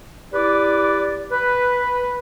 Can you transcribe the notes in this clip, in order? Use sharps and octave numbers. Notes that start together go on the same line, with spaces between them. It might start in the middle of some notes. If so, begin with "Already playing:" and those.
E4 G4 B4 D5
B4